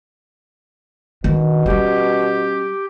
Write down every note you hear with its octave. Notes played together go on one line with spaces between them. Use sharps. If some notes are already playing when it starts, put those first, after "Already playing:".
B2 D#3 D4
G3 C#4 G4